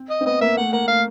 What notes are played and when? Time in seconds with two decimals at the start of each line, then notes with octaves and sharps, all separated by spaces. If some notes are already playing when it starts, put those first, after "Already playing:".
Already playing: C4
0.10 D#5
0.21 C4
0.26 B3 D#5
0.41 A#3 E5
0.57 A3 F#5
0.73 A#3 F#5
0.88 A3 F5